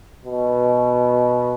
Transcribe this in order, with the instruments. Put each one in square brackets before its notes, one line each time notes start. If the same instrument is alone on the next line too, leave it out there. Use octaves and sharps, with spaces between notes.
[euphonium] B2